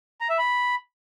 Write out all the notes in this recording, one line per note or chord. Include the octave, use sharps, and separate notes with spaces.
A#5
E5
B5